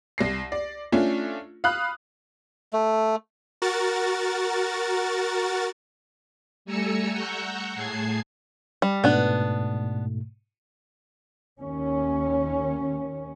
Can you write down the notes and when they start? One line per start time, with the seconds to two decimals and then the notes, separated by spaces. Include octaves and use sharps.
0.18 C2 A#6 C7
0.52 D5
0.92 A3 C#4 D4 F4
1.64 F5 B5 D#6 F#6
2.73 A3
3.62 F#4 A#4 A6
6.65 G3 A3 G#5 A#5 E6 C#7
7.13 F#5 A#5 C#6 E6 F#6 G6
7.75 A2 G#4 A5 G#6 C7
8.82 G3
9.04 G#2 B2 A3 B3 D4
11.59 D#2 C#4